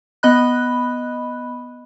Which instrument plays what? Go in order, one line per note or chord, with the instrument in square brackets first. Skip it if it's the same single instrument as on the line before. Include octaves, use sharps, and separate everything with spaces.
[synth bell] B3 D#5 B5 F#6